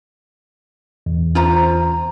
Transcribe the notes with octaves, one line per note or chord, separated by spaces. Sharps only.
E2
F4 C5 A#5